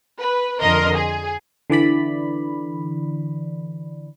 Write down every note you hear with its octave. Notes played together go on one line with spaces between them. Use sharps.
B4
F2 D3 A#4 D#5 C6
G#4
D3 E3 D5 B5